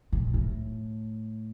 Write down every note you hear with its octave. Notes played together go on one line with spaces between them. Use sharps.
A#2
A2